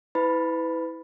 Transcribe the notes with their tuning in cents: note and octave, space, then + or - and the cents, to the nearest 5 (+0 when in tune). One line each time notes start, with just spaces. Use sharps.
E4 -20 B4 +30 B5 +0